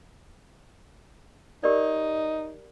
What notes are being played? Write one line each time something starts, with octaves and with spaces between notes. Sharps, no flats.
D#4 G4 A#4 D5